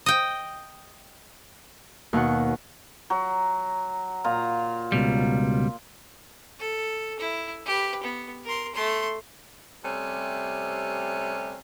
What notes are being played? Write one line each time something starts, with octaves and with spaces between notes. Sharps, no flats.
D#5 G5
D#2 B2 F#5
F#3
A#2 F4 A#5
C#2 B2 G3
A4
E4
G4 B4
B3
A#4 C6
A3 C6
C3 G3 A3 C4 C#4